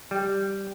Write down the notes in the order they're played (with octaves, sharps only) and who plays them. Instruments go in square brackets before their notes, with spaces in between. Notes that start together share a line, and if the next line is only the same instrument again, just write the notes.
[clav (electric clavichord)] G3